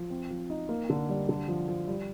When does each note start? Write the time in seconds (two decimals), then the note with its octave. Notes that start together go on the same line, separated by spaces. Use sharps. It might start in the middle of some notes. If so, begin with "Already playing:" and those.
Already playing: F3
0.10 C4
0.31 F3
0.50 D#4
0.69 A#3
0.90 D3
1.09 G3
1.29 D3
1.48 F3
1.68 F3
1.87 G3